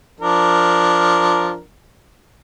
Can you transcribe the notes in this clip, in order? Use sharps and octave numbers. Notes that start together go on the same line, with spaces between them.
F3 D4 A#4